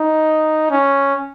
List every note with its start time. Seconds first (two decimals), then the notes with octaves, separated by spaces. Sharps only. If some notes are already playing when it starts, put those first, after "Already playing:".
Already playing: D#4
0.71 C#4